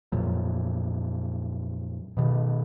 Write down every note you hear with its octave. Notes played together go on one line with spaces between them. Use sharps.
F2 A#2 F#3
B2 D#3